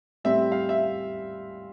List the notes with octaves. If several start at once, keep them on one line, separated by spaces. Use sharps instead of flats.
A2 G3 C4 E5
F5
E5